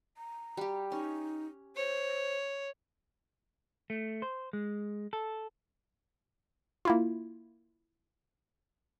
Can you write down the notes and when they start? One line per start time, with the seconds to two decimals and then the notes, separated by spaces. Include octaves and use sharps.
0.17 A#5
0.57 G3 G4
0.92 C#4 D#4
1.76 C5 C#5
3.90 A3
4.22 C5
4.53 G#3
5.13 A4
6.85 A#3 E4 F4